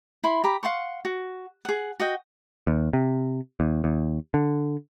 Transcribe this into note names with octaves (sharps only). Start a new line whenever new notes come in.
E4 B5 C6
G4 A#5 B5
F5 F#5 C6 C#6
F#4
G#4 F#5
F#4 D#5 G5
D#2
C3
D#2
D#2
D3